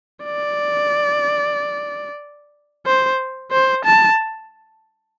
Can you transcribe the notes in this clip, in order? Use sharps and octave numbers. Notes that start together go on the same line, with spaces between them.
D5
C5
C5
A5